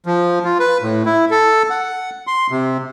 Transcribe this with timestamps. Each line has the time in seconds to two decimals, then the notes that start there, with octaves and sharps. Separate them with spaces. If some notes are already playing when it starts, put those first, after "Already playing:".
0.06 F3
0.45 F4
0.60 B4
0.82 A2
1.06 E4
1.31 A4
1.70 F#5
2.27 C6
2.51 C3